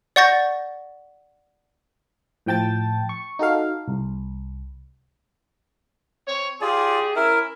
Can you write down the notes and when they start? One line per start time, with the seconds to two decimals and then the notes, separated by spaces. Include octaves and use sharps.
0.16 D5 F#5 C#6 G6 A6 A#6
2.46 A2 F3 G5 A5 A6
3.09 C#6
3.39 D#4 F#4 A4 F5
3.88 C2
6.28 C4 C#5
6.61 F4 G4 G#4 D5
7.16 C#4 E4 A#4